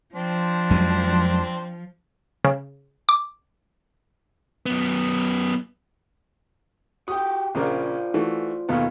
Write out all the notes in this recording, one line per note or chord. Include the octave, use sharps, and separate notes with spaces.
F3 C4 D4 C5
F2 F#3 G#3
C#3
D6
F#2 B3
F#4 G4 G5 D#6
A#1 C#3 F4 A#4 C5 D5
E3 A3 F#4
D#2 B2 B3 F4 A4 F5